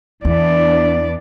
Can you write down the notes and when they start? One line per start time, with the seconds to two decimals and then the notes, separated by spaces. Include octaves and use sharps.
0.25 E2 E3 B3 D4 D5